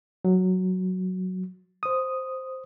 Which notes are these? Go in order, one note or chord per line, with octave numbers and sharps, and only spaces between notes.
F#3
C5 D#6